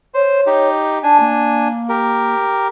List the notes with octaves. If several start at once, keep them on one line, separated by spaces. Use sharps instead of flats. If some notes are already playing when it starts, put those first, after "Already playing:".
C5 C#5
D#4 G4
D4 G#5 A5
A#3
G4 A#4